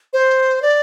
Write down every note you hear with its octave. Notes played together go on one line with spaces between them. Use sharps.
C5
D5